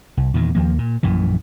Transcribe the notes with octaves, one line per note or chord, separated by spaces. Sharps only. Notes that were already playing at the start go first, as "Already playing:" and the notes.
C2
E2 A#2 D#3
D#2 F3 A#3
A#2
A#1 F#2 A#2 E3